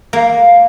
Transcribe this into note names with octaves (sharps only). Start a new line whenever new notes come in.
A#3